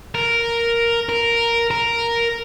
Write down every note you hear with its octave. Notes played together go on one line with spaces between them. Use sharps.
A#4
A#4
A#4